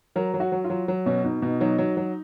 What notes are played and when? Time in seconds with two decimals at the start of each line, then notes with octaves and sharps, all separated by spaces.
0.16 F#3 A#4
0.34 F#3
0.40 F#4
0.52 F#3
0.64 F4
0.70 F#3
0.88 F#3
1.06 B2 C#4
1.24 B2 D#4
1.42 B2 D#4
1.60 F#3 D#4
1.78 F#3
1.97 F#3